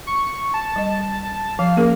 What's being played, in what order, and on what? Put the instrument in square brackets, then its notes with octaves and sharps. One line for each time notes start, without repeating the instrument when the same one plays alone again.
[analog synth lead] C#6
A5
[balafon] G3 D#5
[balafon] F3 [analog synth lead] F5
[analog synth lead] A#3 [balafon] C#4 G#4 A#4